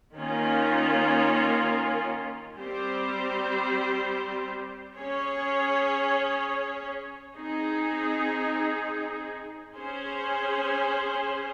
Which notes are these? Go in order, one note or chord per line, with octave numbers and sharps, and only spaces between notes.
D#3 A#3 C#4 F4 A#4
G3 C4 G4 C5
C#4 G#4 C#5
C4 D#4 G#4
C#4 G#4 C5